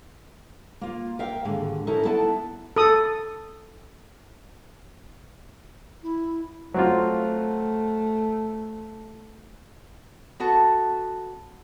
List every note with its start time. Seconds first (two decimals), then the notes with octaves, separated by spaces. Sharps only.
0.81 A#3 F4
1.19 A#4 E5 F5 G5
1.45 D#2 G#2 D3
1.87 C#4 D#4 E4 A4 A#4
2.05 B3 E4 A4 F#5 A5
2.76 A4 D#6
6.03 E4
6.74 F#3 A3 C4 F4
10.40 B3 F#4 A4